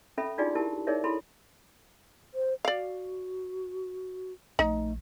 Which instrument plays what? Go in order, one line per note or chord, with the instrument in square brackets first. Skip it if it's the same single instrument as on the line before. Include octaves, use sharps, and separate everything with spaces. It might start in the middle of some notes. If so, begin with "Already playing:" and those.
[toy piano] C#4 A4 E5 B5
D4 D#4 F4 F#4 G#4 D5
E4 G4 A#4 A5
D#4 G#4 A#4 C#5 D5 E5
E4 A4 B5 C6
[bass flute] C5
[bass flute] F#4 [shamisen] D5 F5
[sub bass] A#1 [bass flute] A3 [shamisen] D#4